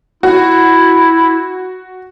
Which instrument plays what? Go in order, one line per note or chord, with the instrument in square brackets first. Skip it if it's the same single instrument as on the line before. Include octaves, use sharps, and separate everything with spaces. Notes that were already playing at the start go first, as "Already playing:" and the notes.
[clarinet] E4 [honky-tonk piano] F#4